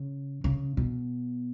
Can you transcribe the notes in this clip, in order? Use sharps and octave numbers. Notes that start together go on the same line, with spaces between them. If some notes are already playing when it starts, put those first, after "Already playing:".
Already playing: C#3
C#3
B2